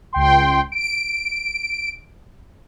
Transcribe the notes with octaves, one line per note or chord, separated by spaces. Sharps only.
C#2 G5 C6
D7